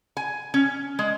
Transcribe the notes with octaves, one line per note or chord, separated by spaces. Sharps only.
G#5
C#4
G#3